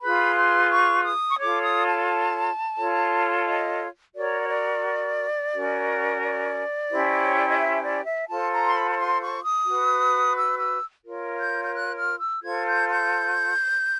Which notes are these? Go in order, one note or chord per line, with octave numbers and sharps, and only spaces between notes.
F4 G#4 B4 B5
C6
C#6
D#6
C#6
F4 A4 C#5 D6
D#6
A5
F4 A4 C#5
D#5
F#4 A#4 C#5 D5
C#5
D5
C#4 F#4 A#4
D5
C#4 E4 G4 C5
C#5
D5
D#5
E5
D5
E5
F4 A4 C5 A5
A#5
C6
B5
B5
C6
C#6
D#6
F#4 B4
E6
E6
F4 A#4 C#5
G6
G6
F#6
F6
E6
F4 A4 C5 G#6
G6
G6